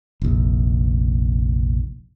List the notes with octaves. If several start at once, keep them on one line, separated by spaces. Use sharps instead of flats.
F1 A#1